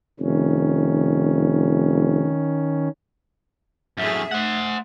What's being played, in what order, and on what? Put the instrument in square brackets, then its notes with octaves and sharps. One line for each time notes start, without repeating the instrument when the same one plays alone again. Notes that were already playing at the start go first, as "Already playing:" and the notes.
[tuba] F1 [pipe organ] D#3 C#4
[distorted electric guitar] F#2 A2 [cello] G#4 E5
[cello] A3 [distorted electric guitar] C5 F#5